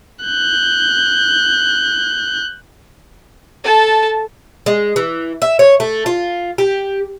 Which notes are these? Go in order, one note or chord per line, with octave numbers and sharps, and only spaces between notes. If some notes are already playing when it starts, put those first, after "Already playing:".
F#6 G6
A4 A5
G#3
E3
E5
C#5
A3
F4
G4